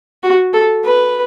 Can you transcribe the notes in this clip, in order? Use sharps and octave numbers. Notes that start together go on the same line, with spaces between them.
F#4
A4
B4